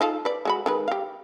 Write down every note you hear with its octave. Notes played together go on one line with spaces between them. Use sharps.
D#4 F4 A4
B4 D5
G#3 F#4 B5
D#3 G#3 B4
G4 F5